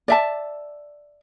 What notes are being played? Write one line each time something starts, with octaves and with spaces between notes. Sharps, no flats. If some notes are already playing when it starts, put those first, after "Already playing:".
D5 E5 A5